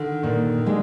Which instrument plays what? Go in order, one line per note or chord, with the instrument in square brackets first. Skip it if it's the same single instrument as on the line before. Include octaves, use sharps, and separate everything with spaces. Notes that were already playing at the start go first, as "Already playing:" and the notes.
Already playing: [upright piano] D3 D#3
[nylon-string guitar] A#2 [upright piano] D#3
[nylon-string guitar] G#3 D4